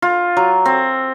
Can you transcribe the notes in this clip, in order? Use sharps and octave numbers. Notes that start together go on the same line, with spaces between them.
F4
F#3
C4